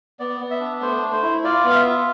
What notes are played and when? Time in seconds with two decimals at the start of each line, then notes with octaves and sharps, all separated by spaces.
0.19 B3 D5
0.40 B3
0.51 E5
0.60 D4
0.81 A3 C5
1.03 A3
1.12 C5
1.23 E4
1.44 F4 D5
1.64 B3
1.70 F5
1.75 E5
1.85 F4